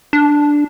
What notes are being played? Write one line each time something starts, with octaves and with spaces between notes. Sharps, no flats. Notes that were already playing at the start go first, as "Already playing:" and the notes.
D4